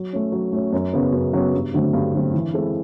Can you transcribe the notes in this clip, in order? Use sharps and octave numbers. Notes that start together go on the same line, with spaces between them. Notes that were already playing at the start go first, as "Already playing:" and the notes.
Already playing: F#3
A3 C#4
F#3
A3 C#4
F#2
C#3 F#3 B3
F#2
C#3 F#3 B3
G2
D3 F#3 A3 C4
G2
D3 F#3 A3 C4
E3
G#3 C4 E4 A4